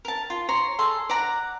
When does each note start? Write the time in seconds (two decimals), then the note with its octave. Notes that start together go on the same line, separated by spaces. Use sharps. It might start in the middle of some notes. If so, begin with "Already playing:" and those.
0.05 A#4 A5
0.30 F4
0.49 C#5 A#5 C6
0.79 G#4 A4 C6
1.10 D5 F#5 A#5